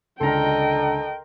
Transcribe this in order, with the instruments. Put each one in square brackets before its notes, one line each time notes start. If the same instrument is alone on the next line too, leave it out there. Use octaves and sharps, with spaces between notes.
[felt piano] C#2 D3 [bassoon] A4 [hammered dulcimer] A#4 A#5 C6 [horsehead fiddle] D#5 G5